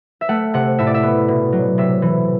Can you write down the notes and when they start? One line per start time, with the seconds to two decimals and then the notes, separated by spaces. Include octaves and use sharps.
0.21 E5
0.29 A3 F#5
0.54 C3 F#5
0.78 A2 E5
0.87 D5
0.94 E5
1.03 B3
1.28 B2
1.52 F#3
1.78 C3 E5
2.02 E3